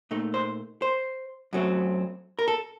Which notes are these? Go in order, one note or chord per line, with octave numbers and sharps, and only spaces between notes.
A#2 A3 D#4
C5
C5
F#2 F#3 A3 C4
A#4
A4